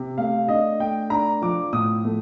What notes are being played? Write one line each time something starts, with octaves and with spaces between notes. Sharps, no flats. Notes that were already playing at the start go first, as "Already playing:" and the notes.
Already playing: C3
A3 F5
D4 D#5
A3 G5
D4 A#5
F3 D6
A2 D#6
A3